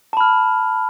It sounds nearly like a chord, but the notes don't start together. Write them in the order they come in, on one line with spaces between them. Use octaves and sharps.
A5 B5 F6